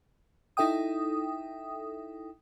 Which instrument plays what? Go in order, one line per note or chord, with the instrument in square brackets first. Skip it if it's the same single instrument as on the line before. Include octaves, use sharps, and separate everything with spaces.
[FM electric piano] D#4 E4 A4 E5 G5 D#6